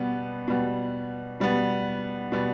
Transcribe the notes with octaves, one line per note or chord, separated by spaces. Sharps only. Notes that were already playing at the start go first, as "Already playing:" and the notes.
Already playing: B2 G3 B3
B2 G3 B3
B2 G3 B3
B2 G3 B3